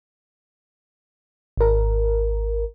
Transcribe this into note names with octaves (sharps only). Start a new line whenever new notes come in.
G#1 A#4